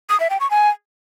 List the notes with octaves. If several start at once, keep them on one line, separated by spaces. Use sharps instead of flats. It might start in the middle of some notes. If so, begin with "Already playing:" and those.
D#6
E5
G5
C#6
G#5